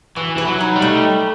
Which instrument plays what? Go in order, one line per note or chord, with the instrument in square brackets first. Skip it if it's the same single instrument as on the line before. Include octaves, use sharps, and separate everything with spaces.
[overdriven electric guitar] E3 [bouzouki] F#4
[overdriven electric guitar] E3 [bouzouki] B4
[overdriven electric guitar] F#3
[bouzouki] D#4
[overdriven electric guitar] G3
[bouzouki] A3